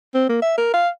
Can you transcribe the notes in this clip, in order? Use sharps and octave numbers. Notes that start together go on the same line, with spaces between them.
C4
A#3
E5
A#4
F5